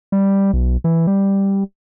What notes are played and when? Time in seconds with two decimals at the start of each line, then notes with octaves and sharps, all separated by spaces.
0.12 G3
0.53 B1
0.84 E3
1.07 G3